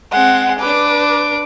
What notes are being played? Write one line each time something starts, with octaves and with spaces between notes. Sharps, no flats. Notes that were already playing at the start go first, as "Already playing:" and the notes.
G#3 C4 F#5
D4 B4 D6